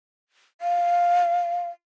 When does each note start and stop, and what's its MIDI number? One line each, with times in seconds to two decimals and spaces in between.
0.61 1.69 77